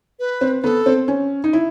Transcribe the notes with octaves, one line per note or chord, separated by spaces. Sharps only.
B4
C4
B3 A4
C4
C#4
D#4
E4